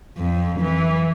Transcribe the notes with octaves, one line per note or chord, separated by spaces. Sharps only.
F2
E3